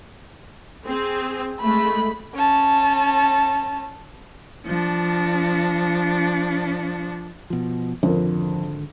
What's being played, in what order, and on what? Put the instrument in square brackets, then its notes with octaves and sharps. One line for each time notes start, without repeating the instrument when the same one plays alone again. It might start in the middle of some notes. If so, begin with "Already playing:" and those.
[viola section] C4 G#4
[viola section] G#3 A3 [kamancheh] B5
[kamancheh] C#4 A5
[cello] F3 D4
[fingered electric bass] B2 F3
[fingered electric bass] G#1 D3 [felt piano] F2 A#4